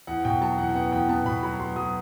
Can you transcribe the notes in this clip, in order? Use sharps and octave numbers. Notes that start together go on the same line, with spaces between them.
E2 F#5
B2 G5
F#3 A5
E2 F#5
G5
B3 F#5
E2 G5
B3 A5
B2 B5
F#3 B5
F#3 C6
F#3 D#6